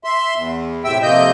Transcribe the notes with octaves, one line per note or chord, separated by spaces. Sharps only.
E5 C6
E2
A2 C3 E5 G5 E6
F2 C3 A#3 D#5 G6